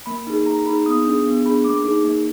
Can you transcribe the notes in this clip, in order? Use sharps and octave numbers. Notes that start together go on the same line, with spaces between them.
A#3 B5
D#4 G#4
A#3 A#5
D#4 G#4 B5
B3 D#6
D4 G#4
B3
D4 G#4 B5
A#3 D6
D#4 G#4
A#3